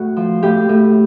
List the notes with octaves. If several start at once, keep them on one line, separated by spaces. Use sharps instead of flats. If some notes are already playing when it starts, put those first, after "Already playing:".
Already playing: A2 F#4
F3
A2 G4
A2